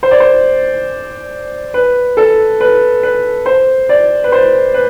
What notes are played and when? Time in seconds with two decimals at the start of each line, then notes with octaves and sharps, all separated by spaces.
0.03 C5
0.11 D5
0.20 C5
1.74 B4
2.17 A4
2.61 B4
3.03 B4
3.46 C5
3.89 D5
4.24 B4
4.32 C5
4.74 B4